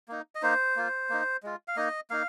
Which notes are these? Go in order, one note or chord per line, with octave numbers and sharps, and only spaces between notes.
A#3 D#4
D#5
A#3 D#4 C5
A#3 F4
A#3 D#4
G#3 F4
F5
A#3 D#4 D#5
A#3 D#4 F5